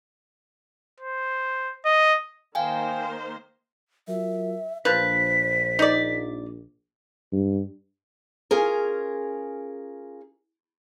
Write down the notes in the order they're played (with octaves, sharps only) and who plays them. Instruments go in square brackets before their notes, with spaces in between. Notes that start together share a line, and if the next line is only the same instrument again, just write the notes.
[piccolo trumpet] C5
D#5
[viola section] D#3 A#3 C5 [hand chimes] F5 G5 G#5
[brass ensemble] F#3 F4 A#4 [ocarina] E5
[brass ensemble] A#1 [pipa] F3 B4 [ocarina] C5 [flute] B6
[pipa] D#4 D5
[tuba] G2
[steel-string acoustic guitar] C#4 F4 G#4 A#4